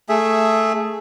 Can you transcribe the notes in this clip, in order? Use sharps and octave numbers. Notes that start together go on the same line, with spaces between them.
A3 G#4 E5